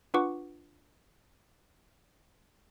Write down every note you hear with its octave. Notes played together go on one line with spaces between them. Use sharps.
D4 F4 B4 F#5 C#6 D6